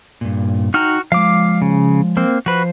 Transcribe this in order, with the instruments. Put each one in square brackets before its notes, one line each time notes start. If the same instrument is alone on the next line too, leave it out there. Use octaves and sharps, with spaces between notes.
[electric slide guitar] G2 A#2
[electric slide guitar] D#4 G5 A#5 [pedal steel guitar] F#4 F6
[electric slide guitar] F3 G#3 [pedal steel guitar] F5 D6
[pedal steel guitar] C#3
A#3 C4 C5
[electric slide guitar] F3 C5 [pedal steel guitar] F#4 B4